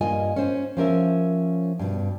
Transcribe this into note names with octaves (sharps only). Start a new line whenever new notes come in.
G2 A#3 F4 D#5 G#5
C#4 C5
F3 C#4 A#4 E5
G2 B2